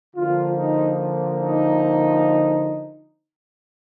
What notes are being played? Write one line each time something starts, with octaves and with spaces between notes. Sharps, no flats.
D3 F3 A#3 F4
D#4
D#4